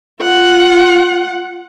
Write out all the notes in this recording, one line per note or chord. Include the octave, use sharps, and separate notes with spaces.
F4 F#5